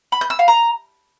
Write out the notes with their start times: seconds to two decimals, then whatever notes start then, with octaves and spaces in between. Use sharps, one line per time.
0.12 B5
0.21 G6
0.30 E6
0.39 F5
0.48 A#5